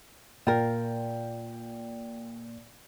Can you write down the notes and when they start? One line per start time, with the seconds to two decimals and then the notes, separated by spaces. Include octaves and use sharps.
0.47 A#2 F4 A#4 G5